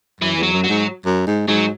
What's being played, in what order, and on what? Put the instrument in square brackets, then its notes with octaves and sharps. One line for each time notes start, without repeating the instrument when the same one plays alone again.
[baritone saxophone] F#2 [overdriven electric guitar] E3
[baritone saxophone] E2
[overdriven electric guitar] F#3
[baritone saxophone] F#2
[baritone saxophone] G#2 [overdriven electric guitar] F#3
[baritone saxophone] F#2
G#2
[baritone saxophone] G#2 [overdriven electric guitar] F#3